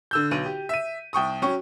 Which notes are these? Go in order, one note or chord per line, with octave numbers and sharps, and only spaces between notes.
D3 E6 G6
B1 D#7
G4
E5 D#7
C2 G5 C#6 D#6
F#3 C#4 G5 C#6